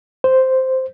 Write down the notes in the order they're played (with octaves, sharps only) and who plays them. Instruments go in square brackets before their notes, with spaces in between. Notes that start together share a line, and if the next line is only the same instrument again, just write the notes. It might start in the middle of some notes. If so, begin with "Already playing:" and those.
[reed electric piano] C5